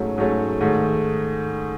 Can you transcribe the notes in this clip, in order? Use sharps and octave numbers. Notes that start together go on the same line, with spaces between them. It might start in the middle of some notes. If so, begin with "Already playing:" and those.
Already playing: G#2 F#3 A3 C#4
G#2 F#3 A3 C#4
G#2 D#3 A3